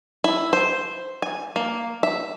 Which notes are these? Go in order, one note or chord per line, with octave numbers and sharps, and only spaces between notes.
E4
C5
G#5
A#3
E5